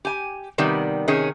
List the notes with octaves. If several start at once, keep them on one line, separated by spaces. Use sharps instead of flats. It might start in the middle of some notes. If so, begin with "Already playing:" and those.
G4 G#5
C3 D#3 G3 B3
C3 D#3 C#4 G#4